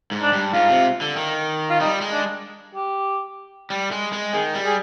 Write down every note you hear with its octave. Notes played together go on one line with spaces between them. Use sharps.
G#2
D4
G2
G#2 F4
C3
D3
D#3
F4
G3 D#4
G#3
D4
G4
G3
G#3
G#3
D#3 G#4
G3
G#4